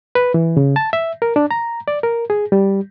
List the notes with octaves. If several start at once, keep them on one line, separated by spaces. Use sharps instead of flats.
B4
E3
C#3
A5
E5
A#4
D4
A#5
D5
A#4
G#4
G3